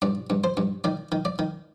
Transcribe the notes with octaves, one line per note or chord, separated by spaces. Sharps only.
G2 D5
G2
C5
G2
D#3 D5
D#3
D5
D#3